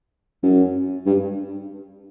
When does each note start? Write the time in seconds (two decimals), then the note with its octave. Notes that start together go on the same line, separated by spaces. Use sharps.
0.43 F#2
1.06 G2